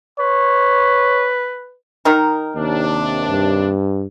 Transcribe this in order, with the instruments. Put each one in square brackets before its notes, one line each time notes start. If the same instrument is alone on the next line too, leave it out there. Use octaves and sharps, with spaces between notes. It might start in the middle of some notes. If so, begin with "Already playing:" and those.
[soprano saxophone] B4 [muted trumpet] C#5
[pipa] D#3 D#4 A#4
[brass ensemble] D#2 C3 D4
[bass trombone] G2